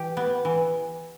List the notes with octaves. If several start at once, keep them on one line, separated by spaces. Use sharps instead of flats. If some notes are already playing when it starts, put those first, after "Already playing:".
Already playing: E3 G4
B3
E3